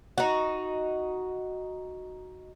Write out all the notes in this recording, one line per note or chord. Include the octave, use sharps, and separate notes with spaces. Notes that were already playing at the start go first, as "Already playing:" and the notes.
D#4 F#4